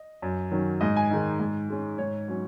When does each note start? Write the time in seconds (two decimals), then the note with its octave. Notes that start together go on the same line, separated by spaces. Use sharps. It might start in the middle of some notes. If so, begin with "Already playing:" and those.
Already playing: D#5
0.22 F#2
0.51 D#3 F#3 C#4
0.81 G#2 D#5
0.96 G#5
1.11 D#3 G#3 D#4
1.39 G#2
1.69 G#3 C#4
1.98 G#2 C#5
2.28 F#3 C#4